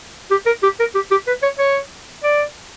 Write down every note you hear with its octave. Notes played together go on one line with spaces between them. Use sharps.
G4
A#4
G4
A#4
G4
G4
B4
C#5
C#5
D5